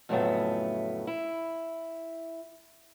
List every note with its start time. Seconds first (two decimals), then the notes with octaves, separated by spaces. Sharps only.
0.09 F2 A2 C#3 F#3 A3 B3
1.07 E4